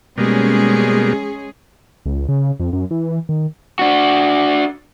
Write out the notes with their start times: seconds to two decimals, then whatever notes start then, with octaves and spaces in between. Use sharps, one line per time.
0.18 B2 G3 G#3 A#3 C#4 G#4
2.06 C#2
2.29 C#3
2.60 F2
2.73 F#2
2.91 E3
3.29 D#3
3.79 D4 F#4